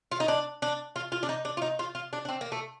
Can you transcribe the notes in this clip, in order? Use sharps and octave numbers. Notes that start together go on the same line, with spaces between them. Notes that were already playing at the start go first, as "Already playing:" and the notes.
F4
D#4
D4
D4
F4
F4
D4
D#4
D4
F4
D#4
F4
F4
D4
D4
C4
A#3
A3